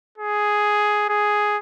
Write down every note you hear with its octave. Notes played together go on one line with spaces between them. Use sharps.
G#4
G#4